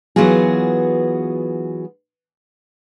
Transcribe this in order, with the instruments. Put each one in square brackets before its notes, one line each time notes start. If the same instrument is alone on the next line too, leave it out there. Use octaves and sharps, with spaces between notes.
[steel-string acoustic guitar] E3 F#3 B3 F4 F#4 G#4